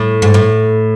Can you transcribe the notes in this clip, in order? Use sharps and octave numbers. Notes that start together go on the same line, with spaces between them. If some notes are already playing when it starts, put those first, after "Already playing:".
Already playing: A2
G#2
A2